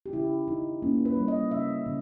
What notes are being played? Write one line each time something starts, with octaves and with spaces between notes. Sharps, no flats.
G4
C#3 E4
C#3 D#4
A#3 C#4
B4
G3
D#5
C#3 E5
C#3